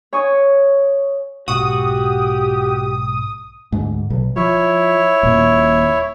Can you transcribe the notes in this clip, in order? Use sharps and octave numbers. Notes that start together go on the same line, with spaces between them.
C#5 G#5 C#6 D#6
B1 G#2 F#4 G4 D#6
D2 G#2
B1
F3 E4 C#5
D#1 A#2